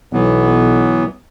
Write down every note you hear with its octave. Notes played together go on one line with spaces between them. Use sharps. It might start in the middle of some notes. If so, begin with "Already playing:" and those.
B1 E3 F#3 B3